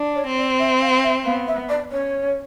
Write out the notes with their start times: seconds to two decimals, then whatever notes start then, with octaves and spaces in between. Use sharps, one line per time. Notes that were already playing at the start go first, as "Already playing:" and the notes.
Already playing: D4
0.15 C#5
0.26 C4
0.37 D5
0.59 E5
0.81 F5
1.03 E5
1.25 B3 F5
1.48 E5
1.69 D5
1.91 C#4 C#5